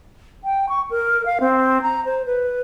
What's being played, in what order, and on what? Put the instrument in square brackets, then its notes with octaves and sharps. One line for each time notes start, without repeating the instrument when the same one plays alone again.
[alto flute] G5
C#6
A#4
F5
C4
A#5
C5
B4